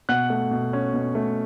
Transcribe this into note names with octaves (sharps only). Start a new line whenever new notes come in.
B2 F#5 F#6
A3
B2
C#4
B2
A3